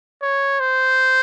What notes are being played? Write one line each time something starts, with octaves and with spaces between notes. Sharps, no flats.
C#5
C5